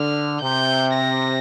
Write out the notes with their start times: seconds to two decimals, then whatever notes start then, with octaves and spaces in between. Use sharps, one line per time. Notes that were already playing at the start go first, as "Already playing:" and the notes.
Already playing: D3 F6
0.42 C3 G6
0.94 A#6